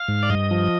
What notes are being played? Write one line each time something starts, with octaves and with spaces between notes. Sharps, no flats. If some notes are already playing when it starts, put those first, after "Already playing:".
Already playing: F5
G#2
D5
G2 D#5
F3